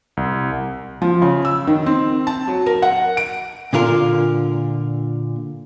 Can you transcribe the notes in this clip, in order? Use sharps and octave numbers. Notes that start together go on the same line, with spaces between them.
C2
F3
C#3
E6
D#3
C4
A5
F#3
A#4
F#5
D7
A#2 D3 F4 A#4